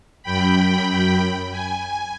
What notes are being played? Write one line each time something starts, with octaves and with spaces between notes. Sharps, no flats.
F#2 G5 B5
G#5